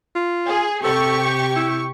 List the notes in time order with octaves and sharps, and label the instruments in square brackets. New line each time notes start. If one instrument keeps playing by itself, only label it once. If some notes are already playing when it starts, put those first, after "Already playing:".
[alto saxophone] F4
[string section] G#4
[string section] C3 G4 C#6 [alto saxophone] A4
[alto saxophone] E4